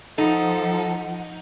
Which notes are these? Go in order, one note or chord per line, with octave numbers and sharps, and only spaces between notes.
F3 D#4 A4 F#5